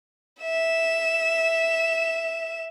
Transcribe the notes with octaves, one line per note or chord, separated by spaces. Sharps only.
E5 E7